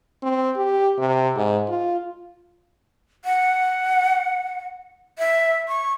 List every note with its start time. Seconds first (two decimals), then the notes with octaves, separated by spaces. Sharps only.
0.23 C4
0.56 G4
0.99 C3
1.36 G#2
1.69 F4
3.25 F#5
5.19 E5
5.68 C#6